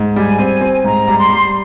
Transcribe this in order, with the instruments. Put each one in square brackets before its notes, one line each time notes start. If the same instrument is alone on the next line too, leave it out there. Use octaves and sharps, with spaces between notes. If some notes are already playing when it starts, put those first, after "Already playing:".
Already playing: [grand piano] G#2
[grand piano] G3 [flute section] G#5
[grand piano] C4
C4
[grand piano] G#2 [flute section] A#5
[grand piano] G3
[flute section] C6
[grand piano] G3